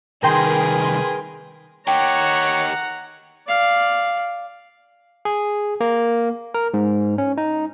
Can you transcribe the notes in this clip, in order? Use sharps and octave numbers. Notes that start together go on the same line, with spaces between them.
C2 D#3 G#4 A#4 B4 G5 C6
D#3 G4 C#5 F#5 G5 A#5
D5 F5
G#4
A#3
A#4
G#2
C#4
D#4